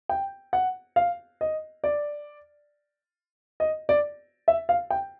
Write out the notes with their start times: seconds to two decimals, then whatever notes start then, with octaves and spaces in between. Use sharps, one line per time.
0.09 G5
0.53 F#5
0.96 F5
1.41 D#5
1.84 D5
3.60 D#5
3.89 D5
4.48 E5
4.69 F5
4.90 G5